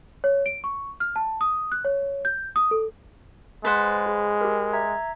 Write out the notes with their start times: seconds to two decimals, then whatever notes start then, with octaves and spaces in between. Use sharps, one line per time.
0.24 C#5
0.46 D7
0.64 C#6
1.00 F6
1.16 A5
1.41 D#6
1.72 F#6
1.85 C#5
2.25 G6
2.56 D#6
2.71 A4
3.65 G#3 B4 C5 F#5 A6
4.06 G#4
4.41 G4 A#4
4.73 E5 A#5 G#6